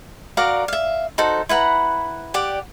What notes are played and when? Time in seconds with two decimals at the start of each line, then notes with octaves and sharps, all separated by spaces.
0.37 F#4 A#4 D5 F5
0.68 E5 F5
1.18 D#4 F#4 A4 C5
1.49 E4 B4 F#5 A#5
2.34 G4 D5 F#5